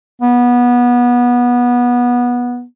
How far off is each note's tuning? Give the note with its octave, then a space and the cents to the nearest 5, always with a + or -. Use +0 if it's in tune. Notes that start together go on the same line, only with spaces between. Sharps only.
B3 -20